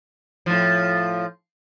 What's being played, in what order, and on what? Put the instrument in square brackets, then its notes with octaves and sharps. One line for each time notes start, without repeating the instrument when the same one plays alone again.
[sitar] A2 F3